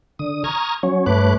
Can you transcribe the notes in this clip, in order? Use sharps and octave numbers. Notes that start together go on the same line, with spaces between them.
D3 D#6
A#5 C#6 D#6 F6 G#6
F#3 C#4 C#5
G2 A3 B4 C#5 D6 F#6